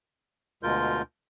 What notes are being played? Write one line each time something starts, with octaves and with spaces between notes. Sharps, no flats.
D2 B2 G#3 F4 A#4 G6